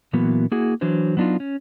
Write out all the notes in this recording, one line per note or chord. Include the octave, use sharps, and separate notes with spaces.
A#2 E3 F#3 A#3 B3
A#3 E4 F#4 G#4
E3 F#3 D4 C5
F#3 B3 D4 D#4 F4
C#4